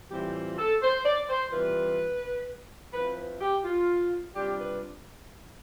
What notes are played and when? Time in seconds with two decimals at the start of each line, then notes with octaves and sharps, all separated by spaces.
0.11 A2 E3 G3 C4 F4 G4
0.58 A4
0.82 C5
1.05 D5
1.29 C5
1.52 E3 G3 C4 F4 B4
2.93 F3 C4 E4 B4
3.17 B4
3.41 G4
3.64 F4
4.35 C3 G3 D4 F4 G4
4.59 B4